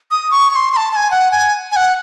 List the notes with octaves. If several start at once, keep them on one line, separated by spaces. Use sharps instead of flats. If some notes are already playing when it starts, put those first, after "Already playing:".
D#6
C#6
C#6
C6
C6
A5
A5
G#5
F#5
G#5
G#5
F#5